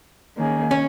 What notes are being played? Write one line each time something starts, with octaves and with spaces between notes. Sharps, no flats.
D#3 A#3 C#4 G#4
C#4